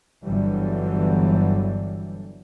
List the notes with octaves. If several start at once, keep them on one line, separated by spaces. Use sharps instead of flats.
G1 D3 E3 F#3 G3